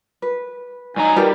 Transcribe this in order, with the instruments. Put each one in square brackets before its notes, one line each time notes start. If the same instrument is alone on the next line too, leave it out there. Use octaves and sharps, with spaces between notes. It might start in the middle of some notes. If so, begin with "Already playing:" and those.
[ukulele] B4
[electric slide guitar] G2 F#3 A#5 [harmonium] D#4 G#5
[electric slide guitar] G3 [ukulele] G4 A#4 B4